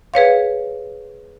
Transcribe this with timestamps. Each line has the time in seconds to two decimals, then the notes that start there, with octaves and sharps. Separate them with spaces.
0.14 G#4 B4 C#5 F5